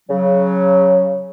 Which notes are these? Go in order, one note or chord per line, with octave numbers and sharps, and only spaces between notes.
C#3 F#3